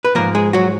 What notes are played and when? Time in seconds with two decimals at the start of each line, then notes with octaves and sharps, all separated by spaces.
0.05 B4
0.15 G#2 F3 A#3 A#4
0.35 G#3 G#4
0.53 F#3 F#4